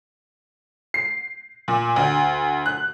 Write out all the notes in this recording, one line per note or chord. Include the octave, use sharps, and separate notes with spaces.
C7
A#2
D2
F#6